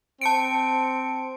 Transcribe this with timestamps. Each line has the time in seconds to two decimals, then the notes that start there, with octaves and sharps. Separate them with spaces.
0.21 C4 A5 C#7 D7